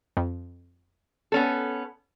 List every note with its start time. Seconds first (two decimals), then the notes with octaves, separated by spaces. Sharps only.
0.17 F2
1.32 B3 C#4 A4